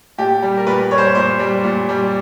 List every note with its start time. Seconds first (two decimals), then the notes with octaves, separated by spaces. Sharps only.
0.18 A#2 G4
0.42 G3
0.57 A#4
0.66 A#2 B4
0.91 G3 C#5
0.98 C5
1.05 C#5
1.15 A#2 C5
1.39 G3
1.64 A#2
1.89 G3